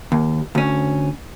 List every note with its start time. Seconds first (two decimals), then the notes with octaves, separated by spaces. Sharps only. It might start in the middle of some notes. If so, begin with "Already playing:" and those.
0.12 D#2
0.55 D2 C#4